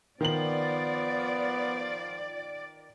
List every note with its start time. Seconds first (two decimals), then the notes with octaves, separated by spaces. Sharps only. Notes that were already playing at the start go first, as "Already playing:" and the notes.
0.21 D#3 F3 B3 D5 F#7